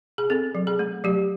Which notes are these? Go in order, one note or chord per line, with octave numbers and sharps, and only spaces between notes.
G#4
C4 A4
F#3
G#4
A3
F#3 G4